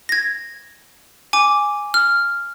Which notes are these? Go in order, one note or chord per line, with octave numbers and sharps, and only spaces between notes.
G#6 A#6
G#5 D6
F6